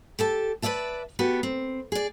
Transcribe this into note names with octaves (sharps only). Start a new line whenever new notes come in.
G4 A4 A5
B4 C#5 D5 E5 A5
B3 F#4 G4 A4
C4
G#4 D5